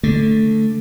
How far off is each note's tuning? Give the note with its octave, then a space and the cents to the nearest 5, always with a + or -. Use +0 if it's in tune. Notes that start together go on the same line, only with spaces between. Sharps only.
D3 +0 A3 +0